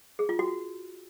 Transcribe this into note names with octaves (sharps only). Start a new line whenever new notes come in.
G#4
F4
F#4